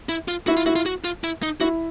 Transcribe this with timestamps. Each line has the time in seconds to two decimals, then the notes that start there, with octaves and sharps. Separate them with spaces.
0.09 E4
0.28 F4
0.47 E4 F#4
0.57 F4
0.66 E4 F#4
0.76 F4
0.86 F#4
1.04 F4
1.24 E4
1.43 D#4
1.61 E4 F#4